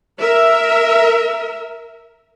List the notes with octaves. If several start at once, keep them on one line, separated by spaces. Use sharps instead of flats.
A#4 E5